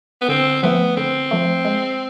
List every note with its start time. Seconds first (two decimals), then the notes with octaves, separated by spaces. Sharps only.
0.21 B3
0.29 D3 C4
0.63 F3 A3 B3
0.97 D3 C4
1.31 F3 A3
1.65 G#3